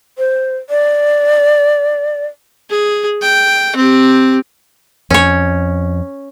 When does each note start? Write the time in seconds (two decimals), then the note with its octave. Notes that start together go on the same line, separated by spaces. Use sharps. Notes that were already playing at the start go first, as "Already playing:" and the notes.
0.18 C5
0.70 D5
2.70 G#4
3.22 G5
3.76 C4 G4
5.10 F2 C#4 C#5